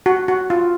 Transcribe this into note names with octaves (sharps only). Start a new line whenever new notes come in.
F#4
F#4
F4